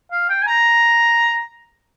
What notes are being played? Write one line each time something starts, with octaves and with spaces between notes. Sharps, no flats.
F5
G5
G#5
A#5